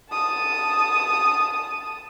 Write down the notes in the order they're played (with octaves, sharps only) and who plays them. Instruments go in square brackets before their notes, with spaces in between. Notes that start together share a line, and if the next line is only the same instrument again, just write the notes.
[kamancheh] A5 D#6